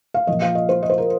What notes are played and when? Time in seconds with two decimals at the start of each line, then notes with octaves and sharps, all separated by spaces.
0.14 F5
0.27 A#2 F3 D#5
0.42 F5
0.55 D#5
0.69 C5
0.83 D#5
0.90 C5
0.98 A#4